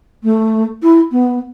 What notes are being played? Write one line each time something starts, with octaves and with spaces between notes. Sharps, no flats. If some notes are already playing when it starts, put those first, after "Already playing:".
A3
E4
B3